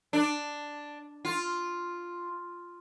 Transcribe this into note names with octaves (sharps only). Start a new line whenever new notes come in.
D4
F4